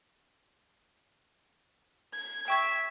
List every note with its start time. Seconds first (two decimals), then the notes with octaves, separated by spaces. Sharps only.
2.14 G#6
2.48 E5 G5 C#6 G#6